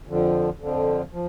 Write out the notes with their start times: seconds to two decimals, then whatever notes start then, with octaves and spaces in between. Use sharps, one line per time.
0.07 F2 D3 F3
0.60 F2 D3 F3
1.13 F3